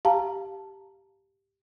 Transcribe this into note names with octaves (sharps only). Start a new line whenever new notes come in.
G4 F5 A5 A#5